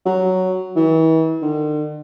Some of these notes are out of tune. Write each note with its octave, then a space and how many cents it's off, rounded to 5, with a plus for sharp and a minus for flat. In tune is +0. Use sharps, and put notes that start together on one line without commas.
F#3 +5
E3 -40
D3 +45